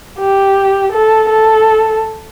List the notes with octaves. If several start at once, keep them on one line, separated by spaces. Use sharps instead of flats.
G4
A4
A4